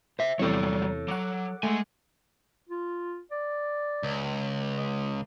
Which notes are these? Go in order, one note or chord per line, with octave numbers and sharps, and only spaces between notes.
C5 E5
E2 C3 E3 F#3 G3 A4 C#5
F#3 F#5 D6
G#3 A3 G#5
F4
D5
C#2
D#5